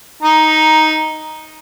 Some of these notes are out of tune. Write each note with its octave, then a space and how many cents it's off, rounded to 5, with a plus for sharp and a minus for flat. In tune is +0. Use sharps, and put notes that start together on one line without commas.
D#4 +5 A#5 +10